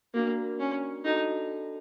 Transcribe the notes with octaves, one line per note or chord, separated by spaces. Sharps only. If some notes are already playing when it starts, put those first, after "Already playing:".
A#3 D4 F#4 A#4
C#4
D4 D#4 F#4 A4